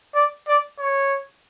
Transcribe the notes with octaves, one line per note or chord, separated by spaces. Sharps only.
D5
D5
C#5